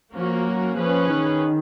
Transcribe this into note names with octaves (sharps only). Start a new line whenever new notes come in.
F3 A#3 C#4 F#4 A#4
F#3
F3 C#4 G#4 B4
D#3